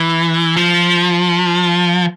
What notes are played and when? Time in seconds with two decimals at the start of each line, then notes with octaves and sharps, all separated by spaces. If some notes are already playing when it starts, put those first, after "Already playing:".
Already playing: E3
0.56 F3